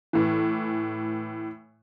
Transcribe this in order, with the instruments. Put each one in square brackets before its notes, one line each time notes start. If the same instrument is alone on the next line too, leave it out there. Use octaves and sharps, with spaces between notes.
[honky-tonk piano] A2 E3